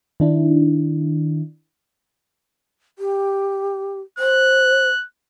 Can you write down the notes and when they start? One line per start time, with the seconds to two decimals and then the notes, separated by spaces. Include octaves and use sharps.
0.20 D#3 D4 E4
2.99 G4
4.19 C5 F#6